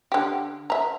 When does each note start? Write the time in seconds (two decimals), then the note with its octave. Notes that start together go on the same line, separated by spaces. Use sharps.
0.12 D3 G4
0.70 E5 A#5